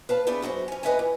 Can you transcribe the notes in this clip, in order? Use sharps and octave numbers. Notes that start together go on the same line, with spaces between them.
B4 F5 A5
A3 B3 D4 E4 G#4
F#2 F#4 A4 C5
C#4 G#5
D#2 B4 D#5 E5 F#5 G#5
E3